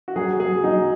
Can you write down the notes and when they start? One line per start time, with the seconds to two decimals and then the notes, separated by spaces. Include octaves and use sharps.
0.08 F#4
0.16 F#3 G#4
0.40 F#3 G#4
0.64 F#3 D#4